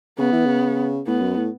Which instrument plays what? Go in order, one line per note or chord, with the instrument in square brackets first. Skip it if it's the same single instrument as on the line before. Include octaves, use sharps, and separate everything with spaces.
[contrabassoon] C#3 [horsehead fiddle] B3
[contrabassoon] E3
C#3
[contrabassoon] A2 [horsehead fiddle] B3
[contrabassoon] F#2
A2